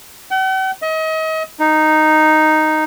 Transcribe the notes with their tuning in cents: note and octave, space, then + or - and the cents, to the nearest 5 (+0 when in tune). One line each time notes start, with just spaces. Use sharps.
F#5 +45
D#5 +35
D#4 -5